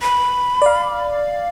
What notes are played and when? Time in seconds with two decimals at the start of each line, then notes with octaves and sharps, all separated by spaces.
0.02 B5
0.62 D5 F5